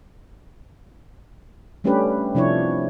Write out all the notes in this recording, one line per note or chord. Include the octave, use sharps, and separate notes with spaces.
G3 A3 C#4 D4 G4 B4
C3 F3 D4 E4 C#5